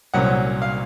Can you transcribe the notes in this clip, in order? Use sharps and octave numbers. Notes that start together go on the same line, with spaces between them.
C2 A#2 F#3 C#4 F#5
F5